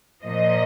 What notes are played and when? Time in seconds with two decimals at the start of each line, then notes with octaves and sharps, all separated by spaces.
0.25 A#2 F3 D#5